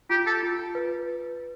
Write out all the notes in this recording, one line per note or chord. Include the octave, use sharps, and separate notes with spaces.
F4 G4
A4
F4
B4